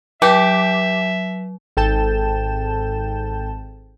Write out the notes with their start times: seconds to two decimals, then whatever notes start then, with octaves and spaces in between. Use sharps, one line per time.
0.22 F#3 G4 E5
1.77 G#1 A4 G5 A5 G6 E7